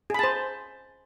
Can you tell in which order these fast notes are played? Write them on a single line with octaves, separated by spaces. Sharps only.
G#4 B5 A5 C5